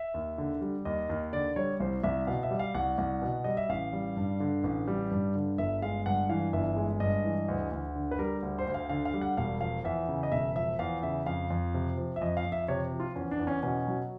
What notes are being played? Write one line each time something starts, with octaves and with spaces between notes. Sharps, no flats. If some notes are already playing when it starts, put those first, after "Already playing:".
Already playing: E5
D#2
D3
G3
D#2 D#5
D#2
D3 D5
G3 C#5
C2 C5
C2 E5
B2 F5
E5
G3
F5
C2 F#5
C2
B2
G3 D#5
E5
A1 F5
G3
G2
D3
A1
G3
G2
D3
G1 E5
G#3 F5
G2 F#5
E3 F5
G1 E5
G#3
G2 D#5
E3
D2
D2
D3
B4
G3 A#4
D2
C5
D2
F5
D3 F5
F5
G3
F#5
E1 F5
F3 F5
E2 E5
C#3
D#5
E1 E5
F3 E5
E2 F5
C#3 E5
F2 F5
F2
C3
F3
E5
F2 D#5
F5
F2
E5
C3 C#5
F3
F4
E2 C#4
D4
E2
C#4
B2 C#4
F#3